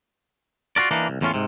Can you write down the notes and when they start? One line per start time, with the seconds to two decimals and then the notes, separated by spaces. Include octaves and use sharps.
0.76 F4 F#4 A#4 D5
0.91 E3 A#3 D4 D#4
1.08 C2
1.21 E2 A2 C#4 F4
1.34 G#2 C3